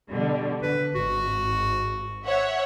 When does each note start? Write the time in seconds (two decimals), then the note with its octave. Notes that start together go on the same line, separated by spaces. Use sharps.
0.11 B2 D3 G3
0.62 D3 B4
0.95 G#1 F#4
2.25 C#5 E5 F#5